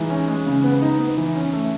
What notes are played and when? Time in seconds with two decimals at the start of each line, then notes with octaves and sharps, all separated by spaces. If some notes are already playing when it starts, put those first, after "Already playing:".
Already playing: E3 G#3 D#4
0.10 C#4
0.28 G#3
0.46 C#3
0.64 B3
0.81 D#4
0.99 B3
1.17 E3
1.36 C#4
1.53 A3